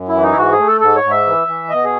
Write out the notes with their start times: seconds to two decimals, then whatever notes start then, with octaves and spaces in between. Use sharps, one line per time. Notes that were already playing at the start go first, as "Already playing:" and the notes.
Already playing: F#2
0.08 E4
0.15 E3
0.23 D#4
0.32 E4
0.37 G#2 F#4
0.52 G#4
0.59 A3
0.67 A4
0.81 G#2 A4
0.96 C#5
1.04 G#2
1.11 E5
1.26 E3
1.48 E3
1.69 B2 D#5
1.84 G#4